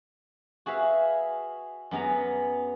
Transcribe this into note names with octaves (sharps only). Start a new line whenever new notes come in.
F#4 G#4 B4 E5 F5
F#2 B3 G#4 A#5